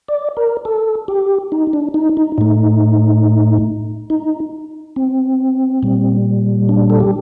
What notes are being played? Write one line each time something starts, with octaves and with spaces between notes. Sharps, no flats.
D5
A#4
A4
G4
D#4
D4
D#4
D#4
A2 A3 D#4
D#4
C4
A#2 G3
D4
A4
G4